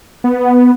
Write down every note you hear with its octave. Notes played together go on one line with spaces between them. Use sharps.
B3